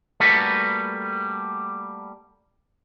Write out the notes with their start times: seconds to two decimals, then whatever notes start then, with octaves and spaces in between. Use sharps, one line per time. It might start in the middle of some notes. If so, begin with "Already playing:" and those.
0.20 G3 A3 A#3 F#4 A4 B4